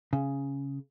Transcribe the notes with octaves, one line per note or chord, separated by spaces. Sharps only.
C#3